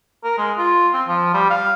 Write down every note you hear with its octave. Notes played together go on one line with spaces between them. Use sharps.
A#4
G#3
F4
C4
F3
G3
F5